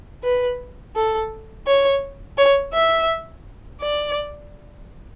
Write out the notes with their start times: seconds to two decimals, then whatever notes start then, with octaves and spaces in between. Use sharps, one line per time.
0.23 B4
0.96 A4
1.66 C#5
2.38 C#5
2.73 E5
3.81 D5